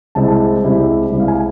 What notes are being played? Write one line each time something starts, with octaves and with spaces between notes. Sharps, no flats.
C2 C3 G#3 C4 E4 A5
C2 C3 G#3 C4 E4
C2 C3 G#3 C4 E4
F5
G#5